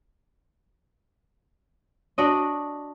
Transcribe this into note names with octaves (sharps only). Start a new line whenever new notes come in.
D4 F#4 D#5